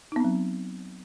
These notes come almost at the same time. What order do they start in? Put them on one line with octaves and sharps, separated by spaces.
D#4 B3 C4 F#3